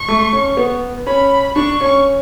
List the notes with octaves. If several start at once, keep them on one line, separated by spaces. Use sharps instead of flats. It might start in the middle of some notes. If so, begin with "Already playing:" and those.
Already playing: C#6
A3
C#4
B3
C#4 B5
D4 C#6
C#4